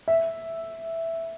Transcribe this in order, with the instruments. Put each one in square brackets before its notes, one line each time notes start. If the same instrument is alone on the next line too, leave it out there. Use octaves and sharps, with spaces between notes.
[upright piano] E5